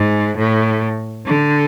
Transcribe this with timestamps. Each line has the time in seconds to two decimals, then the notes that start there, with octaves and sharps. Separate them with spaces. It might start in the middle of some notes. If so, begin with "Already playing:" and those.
Already playing: G#2
0.37 A2
1.26 D3